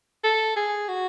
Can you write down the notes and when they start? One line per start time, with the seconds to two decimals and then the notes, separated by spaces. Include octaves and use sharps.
0.24 A4
0.56 G#4
0.88 F#4